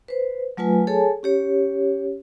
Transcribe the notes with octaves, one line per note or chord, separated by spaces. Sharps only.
B4 C5
F#3 A3 F4 B4 G#5
G#4 A4 C#5 G#5 A5
C#4 G4 C#5